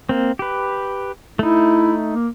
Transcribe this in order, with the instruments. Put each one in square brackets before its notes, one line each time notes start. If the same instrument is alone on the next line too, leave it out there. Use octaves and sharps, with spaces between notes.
[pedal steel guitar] A#3 C4
G4 B4
[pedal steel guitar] A3 D#4 [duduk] E4
[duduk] A#3